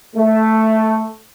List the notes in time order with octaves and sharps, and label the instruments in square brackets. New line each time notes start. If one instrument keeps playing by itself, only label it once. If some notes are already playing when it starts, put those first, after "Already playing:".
[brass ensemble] A3